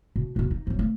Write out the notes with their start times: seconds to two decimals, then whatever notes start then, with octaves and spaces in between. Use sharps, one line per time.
0.16 B2
0.36 D#2 B2
0.51 D#4
0.67 F3 F#3
0.79 A3